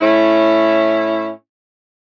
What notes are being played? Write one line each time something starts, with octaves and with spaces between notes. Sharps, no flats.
A2 C#4 E4